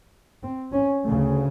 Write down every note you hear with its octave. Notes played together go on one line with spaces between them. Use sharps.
C4
C#4
D2 C#3 A3